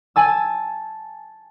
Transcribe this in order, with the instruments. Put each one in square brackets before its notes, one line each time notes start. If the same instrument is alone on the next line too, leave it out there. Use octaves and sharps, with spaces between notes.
[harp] G#5 A5 E6